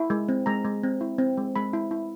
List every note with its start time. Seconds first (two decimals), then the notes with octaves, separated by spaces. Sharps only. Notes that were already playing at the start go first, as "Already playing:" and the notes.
Already playing: E4
0.10 G#3
0.29 C4
0.46 G#3 A#5
0.65 G#3
0.83 C4
1.01 E4
1.18 C4
1.37 G#3
1.56 G#3 B5
1.73 E4
1.91 E4